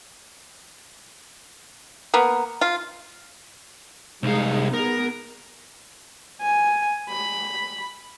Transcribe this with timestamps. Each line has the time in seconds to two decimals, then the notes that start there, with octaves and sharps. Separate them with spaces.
2.14 A#3 B3
2.61 F4
4.23 C2 G#3 D#4 G#4 F5
4.74 B3 G#4 A#4
6.41 G#5
7.10 B5